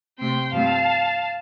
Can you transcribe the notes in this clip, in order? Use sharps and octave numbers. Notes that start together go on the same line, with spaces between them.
C3 A3 C4 G5 C6
G2 F3 A3 C4 F5 A5